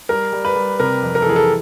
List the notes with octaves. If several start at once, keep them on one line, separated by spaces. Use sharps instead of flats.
G3 A#4
G3
B4
G3
C3 A#4
F2
A#4
A4
E3 G#4
A4